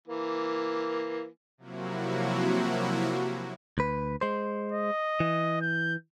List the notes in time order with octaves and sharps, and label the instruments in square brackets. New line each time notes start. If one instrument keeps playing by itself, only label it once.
[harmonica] E3 A#3
[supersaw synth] C3 F3 F#3 A#3 E4 F#4
[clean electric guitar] D2 B4
G#3 C5
[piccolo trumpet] D#5
[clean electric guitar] E3
[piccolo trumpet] G6